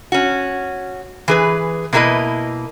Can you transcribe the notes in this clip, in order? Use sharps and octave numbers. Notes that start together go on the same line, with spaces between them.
C#4 F#4
E3 G#4 B4
B2 A#3 E4 G4 B4 D#5